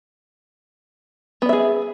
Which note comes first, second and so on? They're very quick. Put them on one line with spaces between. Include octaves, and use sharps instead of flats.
B3 D5 E5 G#4